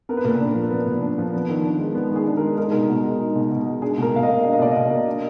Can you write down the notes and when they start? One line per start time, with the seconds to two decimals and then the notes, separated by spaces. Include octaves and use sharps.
0.09 B3 A#4
0.17 B4
0.24 A#2 A#4
0.40 D4
0.55 F3
0.71 B3
0.86 A#2
1.02 D4
1.18 F3
1.33 B3
1.49 D#3
1.65 D4
1.80 G#3
1.95 B3
2.11 D#3 G#4
2.27 D4
2.37 G#3 A#4
2.58 D#4 A#4
2.64 G#4
2.71 B2 A#4
2.89 B2
3.04 G#3
3.20 D#4
3.35 B2
3.51 B2
3.66 G#3
3.82 D4 G#4
3.97 B2 A#4
4.14 B2 F5
4.23 D#5
4.28 A#3
4.43 D4 F5
4.53 D#5
4.59 B2 D5
4.71 B2 D#5
4.91 A#3
5.06 D4